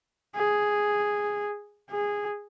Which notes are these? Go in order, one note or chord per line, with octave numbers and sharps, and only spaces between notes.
G#4
G#4